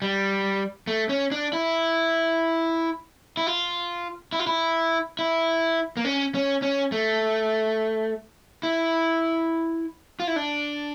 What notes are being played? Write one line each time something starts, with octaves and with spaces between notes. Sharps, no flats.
G3
A3
C#4
D4
E4
E4
F4
E4
F4
E4
E4
A#3
C#4
C#4
C#4
A3
E4
F4
E4
D4